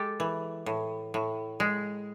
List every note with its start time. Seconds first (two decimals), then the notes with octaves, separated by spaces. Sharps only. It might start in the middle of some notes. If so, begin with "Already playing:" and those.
Already playing: G#3 G4 A4
0.20 E3
0.66 A2
1.14 A2
1.60 G#3